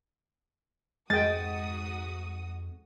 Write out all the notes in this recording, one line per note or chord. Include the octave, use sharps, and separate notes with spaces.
F2 G#2 G#3 F#4 G5 D#6 A6